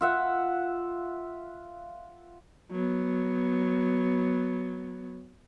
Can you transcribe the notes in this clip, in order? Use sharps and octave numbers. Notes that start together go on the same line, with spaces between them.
F4 E5 F#5
F#3 B3